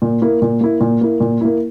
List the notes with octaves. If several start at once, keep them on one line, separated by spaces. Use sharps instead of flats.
A#2
A#3 E4
A#2
A#3 E4
A#2
A#3 E4
A#2
A#3 E4